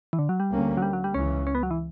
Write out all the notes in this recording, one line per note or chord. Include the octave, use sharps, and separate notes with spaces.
E3
D3
F#3
G3
D2 D3 A#3 C#4
F#3
G3
F#3
G3
C#2 C#3 E3 C#4
C#4
B3
F#3
E3